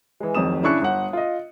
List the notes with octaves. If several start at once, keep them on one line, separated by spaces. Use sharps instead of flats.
E3 G#3
D1 F2 D#3 D#6 E7
C#3 D4 E4 C#6 F#6 C#7
G1 F#5
F4 D#5